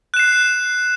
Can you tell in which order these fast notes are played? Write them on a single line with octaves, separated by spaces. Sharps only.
F#6 E7 C7